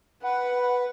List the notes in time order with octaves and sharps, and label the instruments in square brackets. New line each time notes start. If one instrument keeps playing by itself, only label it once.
[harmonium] B4 [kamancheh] F#5